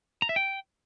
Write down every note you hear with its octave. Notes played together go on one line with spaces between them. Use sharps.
A#5
E5
G5